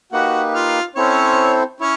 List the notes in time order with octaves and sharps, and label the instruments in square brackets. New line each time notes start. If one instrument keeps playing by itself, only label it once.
[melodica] A#3 D#4 G4 B4 [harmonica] F#4 F#5
[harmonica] F4 F5
[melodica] C4 E4 A4 C5 [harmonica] C#4 C#5
[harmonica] C#4 C#5 [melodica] E4